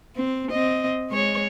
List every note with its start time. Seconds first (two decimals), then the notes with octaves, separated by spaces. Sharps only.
0.16 C4
0.51 C4 D#5
1.09 G#3 C#5